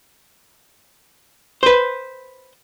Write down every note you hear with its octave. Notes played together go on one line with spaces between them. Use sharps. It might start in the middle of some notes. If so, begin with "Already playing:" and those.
B4 C5